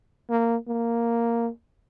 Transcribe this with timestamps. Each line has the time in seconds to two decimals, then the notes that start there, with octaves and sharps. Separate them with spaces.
0.30 A#3
0.68 A#3